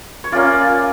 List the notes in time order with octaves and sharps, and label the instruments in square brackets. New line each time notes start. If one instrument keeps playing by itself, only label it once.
[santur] C#5
A#3 C#4 F4 D5